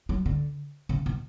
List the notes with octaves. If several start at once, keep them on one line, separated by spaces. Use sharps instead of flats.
F#3
D3
C#3
B2